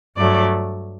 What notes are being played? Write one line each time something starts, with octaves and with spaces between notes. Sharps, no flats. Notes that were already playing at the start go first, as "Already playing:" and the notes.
G2 F#3 A3 D5